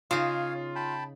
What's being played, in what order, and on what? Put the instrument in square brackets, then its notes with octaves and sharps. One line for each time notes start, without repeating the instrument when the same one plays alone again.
[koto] C#3 D#4 [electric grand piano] F4 [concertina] C#5 F5
[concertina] G5 A5 B5